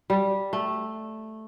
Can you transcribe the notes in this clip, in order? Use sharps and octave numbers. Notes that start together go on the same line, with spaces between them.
G3
A3